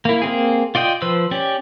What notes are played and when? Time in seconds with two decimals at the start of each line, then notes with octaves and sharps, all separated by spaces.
0.05 A#3 E4
0.22 A#3 C4 G#4
0.75 F4 D5 D#5 G5 D#6
1.02 F3 B4 C5 E6
1.31 C#4 G4 D5